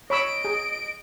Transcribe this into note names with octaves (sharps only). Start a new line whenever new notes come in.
C#5 D#5 B5 E6 D7
G#4